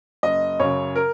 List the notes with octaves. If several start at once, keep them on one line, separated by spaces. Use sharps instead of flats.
F#1 D#5
F#2 C#3 C#5
A#4